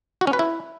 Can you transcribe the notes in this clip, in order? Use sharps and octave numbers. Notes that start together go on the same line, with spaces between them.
F#4
C#4
B4
E4